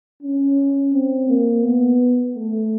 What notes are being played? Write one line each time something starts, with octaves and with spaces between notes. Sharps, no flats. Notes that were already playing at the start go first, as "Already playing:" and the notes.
C#4
C4
A#3
B3
A3